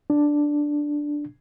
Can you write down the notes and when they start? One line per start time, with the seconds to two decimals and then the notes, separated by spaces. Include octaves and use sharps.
0.10 D4